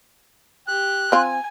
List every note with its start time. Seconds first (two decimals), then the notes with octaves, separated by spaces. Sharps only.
0.68 G4 F#6
1.12 C4 F4 G#5